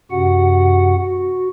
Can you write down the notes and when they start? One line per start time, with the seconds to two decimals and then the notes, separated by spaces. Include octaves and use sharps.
0.11 F#2 C3 F#4 F#5
0.97 F#4